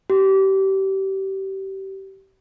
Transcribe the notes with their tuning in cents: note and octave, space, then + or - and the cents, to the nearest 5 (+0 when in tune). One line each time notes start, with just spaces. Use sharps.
G4 -30